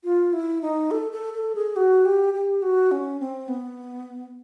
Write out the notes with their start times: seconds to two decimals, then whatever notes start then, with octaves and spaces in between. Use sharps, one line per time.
0.04 F4
0.33 E4
0.62 D#4
0.91 A4
1.12 A4
1.33 A4
1.55 G#4
1.76 F#4
2.05 G4
2.34 G4
2.62 F#4
2.91 C#4
3.20 C4
3.48 B3